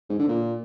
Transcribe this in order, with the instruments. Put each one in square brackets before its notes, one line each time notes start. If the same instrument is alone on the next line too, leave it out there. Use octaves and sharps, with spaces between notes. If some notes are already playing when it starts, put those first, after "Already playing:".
[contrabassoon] G#2
D3
A#2